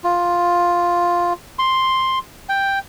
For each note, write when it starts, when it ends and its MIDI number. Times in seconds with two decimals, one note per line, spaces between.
0.04 1.33 65
1.59 2.19 84
2.49 2.79 79